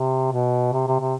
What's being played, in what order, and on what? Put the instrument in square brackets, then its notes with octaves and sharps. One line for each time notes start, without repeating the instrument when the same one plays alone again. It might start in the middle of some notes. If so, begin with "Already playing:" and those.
Already playing: [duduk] C3
B2
C3
C3
C3